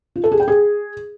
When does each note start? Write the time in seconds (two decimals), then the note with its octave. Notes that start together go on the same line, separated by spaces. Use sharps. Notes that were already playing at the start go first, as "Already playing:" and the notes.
0.16 F4
0.24 A4
0.32 G#4
0.40 G5
0.48 G#4